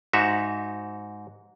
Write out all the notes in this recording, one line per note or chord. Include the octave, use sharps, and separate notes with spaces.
G#2 D#4 F#4 E5